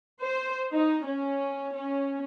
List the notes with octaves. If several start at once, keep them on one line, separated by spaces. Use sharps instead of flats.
C5
D#4
C#4
C#4